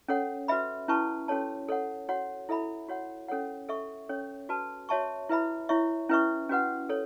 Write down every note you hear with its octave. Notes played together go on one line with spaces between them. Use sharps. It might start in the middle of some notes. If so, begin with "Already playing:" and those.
C#4 A4 C#5 F#5
F#4 B4 E5 B5
C#4 E4 B4 A5 C#6
C#4 F#4 A4 C#5 A5
A4 C#5 F#5
F#4 C#5 F#5
E4 A4 E5 B5
F#4 C#5 F#5
C#4 A4 C#5 F#5
A4 E5 C#6
C#4 A4 C#5
F#4 B4 A5
F#4 C#5 E5 A5 C#6
E4 B4 E5 B5
E4 C#5 E5 C#6
C#4 E4 B4 E5 C#6
C#4 F#4 B4 F#5
A4 C#5